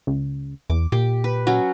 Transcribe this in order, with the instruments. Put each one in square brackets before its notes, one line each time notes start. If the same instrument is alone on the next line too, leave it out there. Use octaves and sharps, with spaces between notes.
[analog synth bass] C#2
[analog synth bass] E2 [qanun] D6
[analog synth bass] A#2 [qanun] G4
[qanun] B4
F#3 C#4 F#4